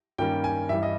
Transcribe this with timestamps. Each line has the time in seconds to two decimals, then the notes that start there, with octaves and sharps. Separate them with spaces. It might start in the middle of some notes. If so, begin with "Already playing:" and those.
0.18 G2 D#3 G3 A#3 C#4 G5
0.44 G#5
0.69 G2 E3 G3 E5
0.83 D#5